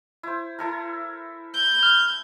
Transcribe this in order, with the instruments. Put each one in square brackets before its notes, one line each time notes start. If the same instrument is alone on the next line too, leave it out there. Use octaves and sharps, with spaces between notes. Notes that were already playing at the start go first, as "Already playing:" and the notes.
[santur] E4 C5
E4 A4 A#4
[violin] G6 G#6
[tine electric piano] F6